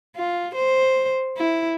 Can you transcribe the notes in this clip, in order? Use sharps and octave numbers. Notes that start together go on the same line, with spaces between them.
F4
C5
E4